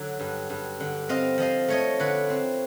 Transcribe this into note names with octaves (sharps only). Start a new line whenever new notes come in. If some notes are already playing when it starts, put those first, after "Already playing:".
Already playing: D3 F#3
G2
G2
D3
C4 D#5 F5
F3 D#5 F5
A3 C#5 D#5
D3 B4 C#5
C4